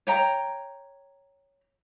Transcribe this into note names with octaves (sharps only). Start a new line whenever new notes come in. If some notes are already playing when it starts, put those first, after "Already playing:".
C#5 G5 A#5